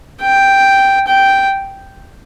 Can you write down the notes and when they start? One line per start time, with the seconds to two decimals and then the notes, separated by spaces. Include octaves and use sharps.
0.22 G5
1.07 G5